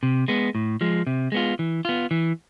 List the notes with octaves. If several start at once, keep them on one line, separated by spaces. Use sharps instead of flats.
C3
G#3 B3
A2
F3 G#3
C3
G#3 B3 F4
E3
B3 F4
E3